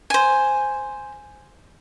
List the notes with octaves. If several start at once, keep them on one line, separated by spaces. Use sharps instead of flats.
C5 G#5